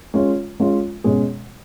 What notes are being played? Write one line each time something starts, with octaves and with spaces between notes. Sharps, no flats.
G#3 C#4 F4
G#3 C#4 F4
B2 G#3 C#4 G#4